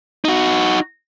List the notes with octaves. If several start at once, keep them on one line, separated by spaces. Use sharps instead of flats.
D#4 F#4